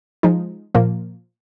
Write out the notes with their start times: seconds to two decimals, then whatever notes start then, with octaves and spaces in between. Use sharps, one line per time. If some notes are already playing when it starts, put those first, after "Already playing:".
0.23 F3 G#3 D#4
0.74 A#2 F3 A#3